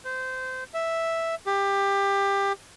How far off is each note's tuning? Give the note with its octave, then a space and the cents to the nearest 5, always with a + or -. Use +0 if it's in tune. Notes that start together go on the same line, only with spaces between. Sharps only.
C5 -20
E5 +0
G4 +20